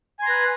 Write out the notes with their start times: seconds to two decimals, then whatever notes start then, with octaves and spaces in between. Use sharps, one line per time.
0.19 G#5
0.22 C6
0.26 A#5
0.29 B4